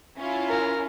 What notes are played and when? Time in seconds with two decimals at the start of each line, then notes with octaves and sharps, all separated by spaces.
0.17 C#4 E4 F4
0.49 A#4